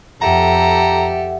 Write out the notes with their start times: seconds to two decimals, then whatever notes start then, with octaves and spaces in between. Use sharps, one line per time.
0.22 F2 G4 A4 E5 F#5 A#5